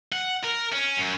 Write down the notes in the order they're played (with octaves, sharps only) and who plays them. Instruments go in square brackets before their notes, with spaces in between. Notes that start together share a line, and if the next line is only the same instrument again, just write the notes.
[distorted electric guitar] F#5
A#4
C#4
F#2